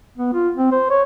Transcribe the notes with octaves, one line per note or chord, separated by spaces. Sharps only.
B3
F4
C4
C5
C#5